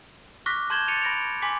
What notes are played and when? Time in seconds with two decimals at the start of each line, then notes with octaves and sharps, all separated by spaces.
0.46 C#6 D6 F6 F#6 A#6 B6
0.70 A5 C6 G6 G#6 E7 G7
0.88 A6 C#7 D#7 F7
1.02 B5 A#6 D7 F7
1.42 G#5 C6 D6 B6